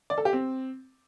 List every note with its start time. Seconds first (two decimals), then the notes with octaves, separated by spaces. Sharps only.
0.10 D5
0.18 A4
0.25 G4
0.33 C4